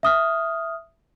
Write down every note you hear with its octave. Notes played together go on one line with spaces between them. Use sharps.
E5 D#6 F6